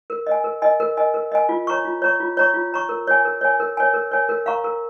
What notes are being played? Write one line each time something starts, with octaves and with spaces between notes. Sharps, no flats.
A#4
D#5 G#5
A#4
D#5 G#5
A#4
D#5 G#5
A#4
D#5 G#5
F4
C#5 A#5 C#6
F4
C#5 A#5 C#6
F4
C#5 A#5 C#6
F4
C#5 A#5 C#6
A#4
C#5 G#5
A#4
C#5 G#5
A#4
C#5 G#5
A#4
C#5 G#5
A#4
F5 A#5 C#6
A#4